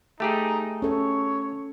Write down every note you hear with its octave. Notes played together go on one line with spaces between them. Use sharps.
A3 D#4 G4 G#4
C#4 A4 C#5